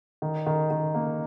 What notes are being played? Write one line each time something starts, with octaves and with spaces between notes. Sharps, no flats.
D#3
D#3
D#3
A#3